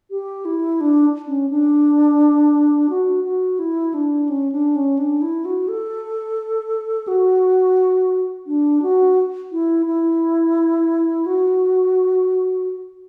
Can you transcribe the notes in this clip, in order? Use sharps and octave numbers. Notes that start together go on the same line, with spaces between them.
G4
E4
D4
C#4
D4
F#4
F#4
E4
D4
C#4
D4
C#4
D4
E4
F#4
A4
F#4
D4
F#4
E4
E4
F#4